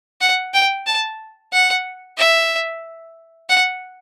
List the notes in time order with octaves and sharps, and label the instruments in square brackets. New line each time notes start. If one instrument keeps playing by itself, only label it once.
[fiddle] F#5
G5
A5
F#5
E5
F#5